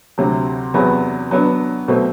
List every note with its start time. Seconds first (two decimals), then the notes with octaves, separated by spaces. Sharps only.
0.18 D2 C3 F#3
0.74 E2 C3 F#3 B3 F#4
1.31 F#3 B3 D4
1.88 B2 F#3 A3 C4